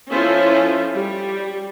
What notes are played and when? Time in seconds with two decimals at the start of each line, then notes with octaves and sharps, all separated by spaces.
0.10 F3 C#4 E4 F4 A4 C5
0.94 G3